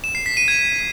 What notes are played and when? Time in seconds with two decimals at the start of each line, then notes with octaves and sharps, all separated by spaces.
0.04 E7
0.15 C7
0.26 B6
0.37 D#7
0.48 G#6